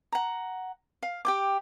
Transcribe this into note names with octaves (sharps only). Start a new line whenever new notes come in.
F#5 A#5
F5
G4 G5 D6